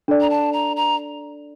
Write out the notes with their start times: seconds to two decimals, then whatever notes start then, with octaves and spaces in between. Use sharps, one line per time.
0.08 D4 A4 D5
0.21 A#5
0.30 A5
0.53 A#5
0.76 A#5